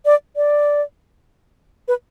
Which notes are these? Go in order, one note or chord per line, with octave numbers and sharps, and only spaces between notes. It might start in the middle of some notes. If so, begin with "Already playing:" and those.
D5
D5
B4